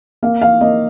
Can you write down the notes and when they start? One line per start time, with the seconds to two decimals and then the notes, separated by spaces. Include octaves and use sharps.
0.23 A#3 F5
0.41 F5
0.61 A#3 D#5